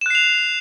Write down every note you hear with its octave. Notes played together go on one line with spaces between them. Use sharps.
F#6 C7 E7 F7